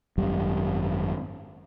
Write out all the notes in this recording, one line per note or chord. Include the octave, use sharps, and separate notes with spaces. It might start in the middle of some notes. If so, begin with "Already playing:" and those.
G#1 F#2 G3